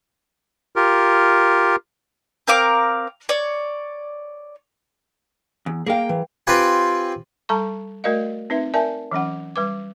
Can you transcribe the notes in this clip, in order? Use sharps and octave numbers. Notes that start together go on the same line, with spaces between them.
F4 G4 A#4
C4 A#4 F5 D6
C#5 D5
E2
A#3 G#4 A#4 F5 G5
E3
C4 F4 G4 B4 G#5
G3 A4 A5 A#5 C#6
A3 F#4 A#4 D5 D#5 F5
C4 D#4 B4 E5
A#4 D5 E5 G#5 A5
E3 F#3 C#4 F#5
G3 B4 D6